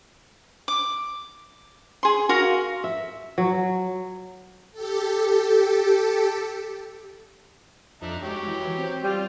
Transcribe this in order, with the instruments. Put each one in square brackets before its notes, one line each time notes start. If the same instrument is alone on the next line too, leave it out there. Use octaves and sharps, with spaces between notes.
[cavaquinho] D6
G#4 C6
F#4 A#4 F5 C6
[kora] E5
F#3
[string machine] G4 A4
[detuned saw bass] F2 [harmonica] D4 D#4 E5
[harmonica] F#3 G4 C#5 [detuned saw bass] G#3
[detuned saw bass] E3
C4
[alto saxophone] G3 [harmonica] F4